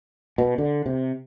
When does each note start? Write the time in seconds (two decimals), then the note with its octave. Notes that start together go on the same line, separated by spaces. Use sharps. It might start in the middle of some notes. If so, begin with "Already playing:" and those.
0.38 B2
0.58 D3
0.86 C3